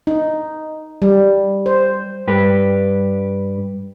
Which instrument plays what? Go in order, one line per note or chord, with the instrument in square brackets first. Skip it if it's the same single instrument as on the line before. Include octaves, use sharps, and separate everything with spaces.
[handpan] D#4
G3
C5
[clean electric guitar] G2 G4 B4